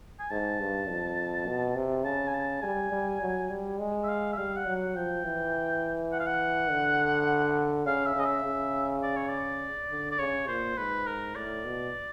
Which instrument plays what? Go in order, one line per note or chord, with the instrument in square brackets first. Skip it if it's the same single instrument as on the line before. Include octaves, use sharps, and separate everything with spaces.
[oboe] G#5
[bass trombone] G#2 [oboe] A5
[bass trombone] G2
F2
B2
C3
[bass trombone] C#3 [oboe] A5
[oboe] G#5
A5
[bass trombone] G3 [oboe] G#5
[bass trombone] G3
F#3
G3
G#3
[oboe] E5
F5
E5
[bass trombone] G3 [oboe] F5
[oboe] F#5
[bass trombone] F#3
[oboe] F#5
[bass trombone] F3 [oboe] G5
[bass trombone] E3
[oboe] F#5
F5
F#5
[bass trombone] D3
[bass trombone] C#3 [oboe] F5
[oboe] E5
[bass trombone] C#3 [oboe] D#5
[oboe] E5
[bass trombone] C#3
[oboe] D5
C#5
D5
[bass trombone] D3
[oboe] D5
[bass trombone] C#3 [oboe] C#5
[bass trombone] A#2 [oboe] C5
[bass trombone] G#2 [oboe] B4
[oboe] A#4
[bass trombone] A2 [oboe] D5
[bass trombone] B2